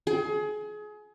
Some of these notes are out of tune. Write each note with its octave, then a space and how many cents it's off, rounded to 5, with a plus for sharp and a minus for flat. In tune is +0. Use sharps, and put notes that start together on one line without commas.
G#4 +30